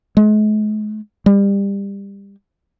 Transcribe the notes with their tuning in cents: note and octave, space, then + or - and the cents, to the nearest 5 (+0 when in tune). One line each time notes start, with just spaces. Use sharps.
G#3 +45
G3 +25